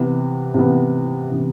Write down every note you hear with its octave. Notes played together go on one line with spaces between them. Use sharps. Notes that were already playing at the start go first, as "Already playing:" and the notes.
Already playing: C3 E3 B3
C3 E3 B3
C3 E3 B3